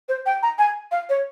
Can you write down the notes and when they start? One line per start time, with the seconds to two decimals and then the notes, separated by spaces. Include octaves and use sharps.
0.09 C5
0.26 G5
0.43 A#5
0.58 G#5
0.92 F5
1.09 C#5